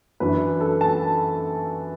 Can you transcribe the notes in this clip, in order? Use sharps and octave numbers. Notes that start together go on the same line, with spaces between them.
F#2 E3 D4 B4
A4
A5